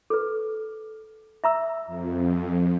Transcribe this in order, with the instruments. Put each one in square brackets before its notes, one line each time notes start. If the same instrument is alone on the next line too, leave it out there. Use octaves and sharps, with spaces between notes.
[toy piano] A4 B4
E5 A#5 E6
[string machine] F2